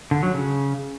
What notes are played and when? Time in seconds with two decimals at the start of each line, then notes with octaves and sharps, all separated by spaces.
0.11 D3
0.23 F#3
0.34 C#3